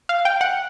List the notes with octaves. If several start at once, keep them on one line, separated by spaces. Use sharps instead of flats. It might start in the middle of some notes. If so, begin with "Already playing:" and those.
F5
G5
F#5